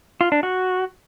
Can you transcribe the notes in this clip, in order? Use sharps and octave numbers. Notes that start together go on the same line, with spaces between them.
F4
D4
F#4